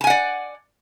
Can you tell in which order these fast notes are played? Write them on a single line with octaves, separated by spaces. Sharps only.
A5 G#5 F#5 D5